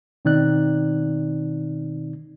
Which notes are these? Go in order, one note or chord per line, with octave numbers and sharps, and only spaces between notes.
B2 D#3 C4 D#4 D5 F#6